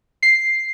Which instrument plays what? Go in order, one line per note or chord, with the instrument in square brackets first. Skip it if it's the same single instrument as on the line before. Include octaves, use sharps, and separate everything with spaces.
[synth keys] C7